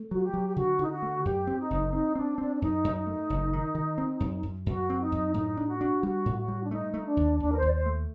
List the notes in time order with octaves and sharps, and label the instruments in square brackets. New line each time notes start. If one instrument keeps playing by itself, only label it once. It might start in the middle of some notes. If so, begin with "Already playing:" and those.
Already playing: [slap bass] A3
[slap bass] F#3 [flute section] F#4
[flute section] G4
[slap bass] F#3
[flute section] G4
[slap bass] D3 [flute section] F#4
[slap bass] D3 [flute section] D#4
[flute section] F#4
[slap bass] A3
[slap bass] F#2 [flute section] G4
[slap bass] C4
[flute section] D#4
[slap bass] F#1
[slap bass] C4 [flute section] D#4
[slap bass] C4 [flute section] D4
[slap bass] C4 [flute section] D4
[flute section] D4
[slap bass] F#2 [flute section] D#4
[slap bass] F#2
[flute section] D#4
[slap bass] A3
F#1
D#3
D#3
C4
F#2
F#2
[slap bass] F#2 [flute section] F#4
[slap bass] C4
[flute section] D#4
[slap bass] F#2
[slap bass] A2 [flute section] D#4
[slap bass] D4
[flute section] F#4
[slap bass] D4
[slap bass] G3 [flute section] F#4
[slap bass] A2
[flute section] F#4
[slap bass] G3
[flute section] D4
[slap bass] A3 [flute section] D#4
[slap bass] A3
[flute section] D4
[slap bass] D#2
[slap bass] D#2 [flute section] D4
[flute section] A#4
C5
[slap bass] D#2
[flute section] D5
C5
[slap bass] A3